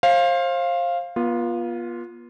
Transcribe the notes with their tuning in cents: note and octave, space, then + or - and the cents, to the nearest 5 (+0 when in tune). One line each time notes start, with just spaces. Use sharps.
C5 +30 F5 -5
B3 -40 F4 +0